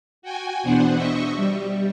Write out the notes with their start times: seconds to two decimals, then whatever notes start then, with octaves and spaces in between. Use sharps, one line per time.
0.22 F#4 G5 G#5
0.63 E2 B2 B3 D4 C5 F#5
0.94 D#5 E5 C#6
1.36 G3